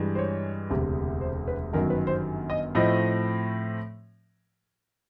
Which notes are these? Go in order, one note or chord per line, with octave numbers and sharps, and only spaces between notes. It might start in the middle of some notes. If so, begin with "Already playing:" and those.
Already playing: G2 E3 G#3
C5
C#5
E1 D2 C3
C5
B4
G1 F#2 D#3 F#3 A#4
B4
C5
D#5
A2 F3 A3 C4 D#5